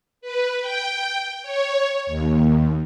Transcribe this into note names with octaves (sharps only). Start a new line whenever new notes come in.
B4
G5
C#5
D#2